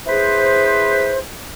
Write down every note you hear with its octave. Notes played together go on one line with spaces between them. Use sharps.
E4 G#4 B4 C5